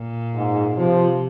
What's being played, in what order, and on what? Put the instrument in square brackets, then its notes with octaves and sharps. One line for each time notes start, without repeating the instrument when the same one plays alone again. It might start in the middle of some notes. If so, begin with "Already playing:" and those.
Already playing: [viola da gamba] A#2
[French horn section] G#2
[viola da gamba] C3 [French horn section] F3